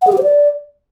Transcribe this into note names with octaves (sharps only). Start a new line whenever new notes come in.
F#5
G#4
G4
C5
D5